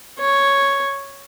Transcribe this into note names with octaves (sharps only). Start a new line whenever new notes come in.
C#5